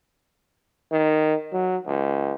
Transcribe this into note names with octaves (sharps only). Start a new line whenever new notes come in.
D#3
F#3
C#2